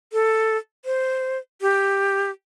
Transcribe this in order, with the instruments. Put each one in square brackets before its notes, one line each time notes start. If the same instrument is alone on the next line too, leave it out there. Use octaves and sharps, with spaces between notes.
[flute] A4
C5
G4